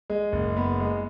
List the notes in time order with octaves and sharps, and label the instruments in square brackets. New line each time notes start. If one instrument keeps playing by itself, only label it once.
[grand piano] G#3
F#1
B3
G#3